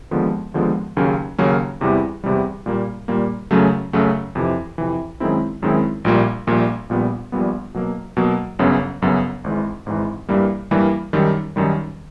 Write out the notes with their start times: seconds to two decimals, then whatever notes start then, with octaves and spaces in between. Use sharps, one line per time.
0.11 D#2 D3 F3 G#3 B3
0.54 D#2 D3 F3 G#3 B3
0.97 D#2 C#3 F#3 A#3 C#4
1.38 D#2 C#3 F#3 A#3 C#4
1.81 E2 C3 E3 G3
2.24 E2 C3 E3 G3
2.66 A#2 G3 A#3
3.08 A#2 G3 A#3
3.51 F#2 C#3 F#3 A3
3.93 F#2 C#3 F#3 A3
4.35 F2 C3 E3
4.78 F2 C3 E3
5.20 F#2 D#3 G#3 C4 E4
5.62 F#2 D#3 G#3 C4 E4
6.05 A#1 A#2 G3 A#3
6.47 A#1 A#2 G3 A#3
6.89 A#1 A#2 G3 B3
7.32 A#1 A#2 G3 B3
7.74 B2 F#3 A#3
8.17 B2 F#3 A#3
8.59 G1 F#2 C#3 F#3 B3
9.02 G1 F#2 C#3 F#3 B3
9.44 G#1 G#2 E3
9.86 G#1 G#2 E3
10.29 G2 E3 G3 A#3
10.71 G2 E3 G3 A#3
11.13 F#2 D#3 G3
11.56 F#2 D#3 G3